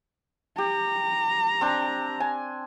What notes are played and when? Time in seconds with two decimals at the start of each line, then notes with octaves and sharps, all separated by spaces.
0.58 G4 A#5
1.61 C4 D4
2.20 G#5